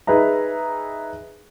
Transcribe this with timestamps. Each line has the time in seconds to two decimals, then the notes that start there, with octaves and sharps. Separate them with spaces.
0.07 D#4 G#4 B4 E5 A#5